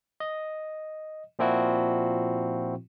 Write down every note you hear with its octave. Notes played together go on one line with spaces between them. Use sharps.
D#5
A#2 F3 C4 E4 F#4